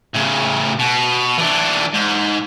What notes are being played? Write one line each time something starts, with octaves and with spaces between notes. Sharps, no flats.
A2 C#3
B2
E3 D4
G#2